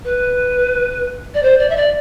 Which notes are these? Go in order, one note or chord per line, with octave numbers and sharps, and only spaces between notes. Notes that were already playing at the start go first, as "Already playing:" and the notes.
B4
D5
C5
D5
E5
D5